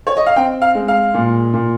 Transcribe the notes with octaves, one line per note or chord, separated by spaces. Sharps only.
C#5
D#5
F5
C4 G5
F5
G#3
F5
A#2
A#2